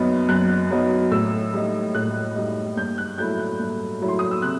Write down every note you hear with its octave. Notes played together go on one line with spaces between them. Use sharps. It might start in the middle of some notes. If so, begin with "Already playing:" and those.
Already playing: F#2 F#3 B3 D#4
F#2 F#6
F#3 B3 D#4
A2 E6
G3 D#4
A2 F#6
G3 D#4
G2 G6
F#6
F#3 A3 E4 G6
F#6
G2
F#3 A3 E4
C6
D#6
E6
C3 F#6